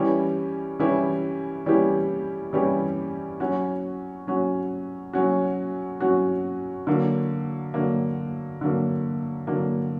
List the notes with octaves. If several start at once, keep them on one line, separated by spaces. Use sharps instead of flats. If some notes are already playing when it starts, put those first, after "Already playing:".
Already playing: E3 G3 C#4 E4 G4
E3 G3 C#4 E4 G4
E3 G3 C#4 E4 G4
E3 G3 C#4 E4 G4
F#3 C#4 F#4
F#3 C#4 F#4
F#3 C#4 F#4
F#3 C#4 F#4
D3 F#3 A#3
D3 F#3 A#3
D3 F#3 A#3
D3 F#3 A#3